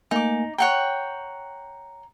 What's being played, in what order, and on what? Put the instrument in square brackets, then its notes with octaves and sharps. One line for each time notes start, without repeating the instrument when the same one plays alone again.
[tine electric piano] A3 A#3 G#5 [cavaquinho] D#4 D6
[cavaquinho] C#5 F#5 G5 [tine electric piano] A#5